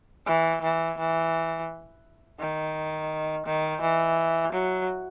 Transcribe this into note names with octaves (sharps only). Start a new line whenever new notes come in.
E3
E3
E3
D#3
D#3
E3
F#3